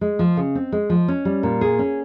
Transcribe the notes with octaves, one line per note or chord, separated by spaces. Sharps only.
G#3
F3
C#3
C4
G#3
F3
C#4
G3
A#2
G#4
C#4